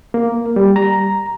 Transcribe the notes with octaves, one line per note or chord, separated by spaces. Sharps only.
A#3
G3
A#5